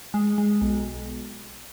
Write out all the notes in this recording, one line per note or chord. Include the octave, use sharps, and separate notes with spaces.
G#3
G#3
B1